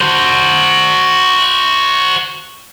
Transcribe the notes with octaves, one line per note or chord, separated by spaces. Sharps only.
F#4 C5